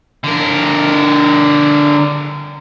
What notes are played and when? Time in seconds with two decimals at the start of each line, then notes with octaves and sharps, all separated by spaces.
0.24 D3 A#4